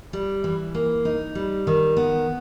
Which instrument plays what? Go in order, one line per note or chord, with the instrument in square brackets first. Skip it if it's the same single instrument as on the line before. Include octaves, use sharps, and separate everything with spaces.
[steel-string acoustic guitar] G3
E3
A#3
D#4
G3
D#3
B3